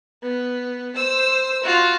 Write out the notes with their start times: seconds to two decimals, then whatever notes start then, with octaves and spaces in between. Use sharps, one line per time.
0.23 B3
0.96 C5 E6
1.64 F4 F#4